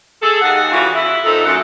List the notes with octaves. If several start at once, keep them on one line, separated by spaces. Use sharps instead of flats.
G#4 A4
D#2 G#4 F#5
E3 G3 C#4 F4 F#4
E4
A#2 C4 D#4 A4
F#2 A#2 A3 A4 F#5